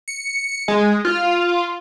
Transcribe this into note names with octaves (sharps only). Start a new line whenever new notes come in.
C#7
G#3
F4